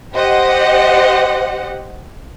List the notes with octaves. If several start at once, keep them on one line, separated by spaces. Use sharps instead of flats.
G4 C5 D#5 F#5